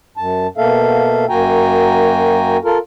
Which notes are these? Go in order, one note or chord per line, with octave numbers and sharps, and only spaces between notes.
F#2 A5
B2 A#3 A4 E5 F5
F#2 A#3 F#4 G5 G#5 A#5
F4 A4 A#4